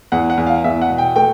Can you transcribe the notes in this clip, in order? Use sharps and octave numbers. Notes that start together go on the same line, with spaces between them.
E2 F#5
F#5
E2
F5
E2 E5
F#5
B2
G5
A3 G5